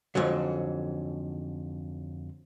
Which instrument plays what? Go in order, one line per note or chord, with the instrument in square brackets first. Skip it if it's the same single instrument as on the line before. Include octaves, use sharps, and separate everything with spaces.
[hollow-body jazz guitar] F2 G#2 D3 F#3